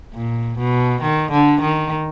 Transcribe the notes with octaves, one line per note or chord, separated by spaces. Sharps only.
A#2
B2
D#3
D3
D#3